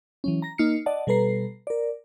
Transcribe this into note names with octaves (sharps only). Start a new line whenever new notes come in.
E3 F#3 C#4
A#5 A#6
A#3 D#4 F6 C7 C#7
D5 D#5 F#5 A5
B2 G3 A4 B4 A#5 C7
A#4 D5